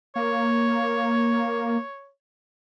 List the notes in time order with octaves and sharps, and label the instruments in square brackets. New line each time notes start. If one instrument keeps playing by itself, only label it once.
[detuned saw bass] A#3 [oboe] C#5